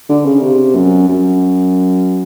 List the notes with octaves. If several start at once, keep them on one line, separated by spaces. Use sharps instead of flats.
D3
C#3
C3
F#2
F#2